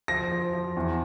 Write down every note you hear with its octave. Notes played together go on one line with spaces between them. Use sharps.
F3 A#6
F3
F3
E2